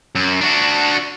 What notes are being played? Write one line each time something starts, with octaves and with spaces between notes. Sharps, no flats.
F#2
D4 F#4